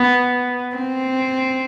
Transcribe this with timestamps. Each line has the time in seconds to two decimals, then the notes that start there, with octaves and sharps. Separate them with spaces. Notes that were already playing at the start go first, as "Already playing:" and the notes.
Already playing: B3
0.76 C4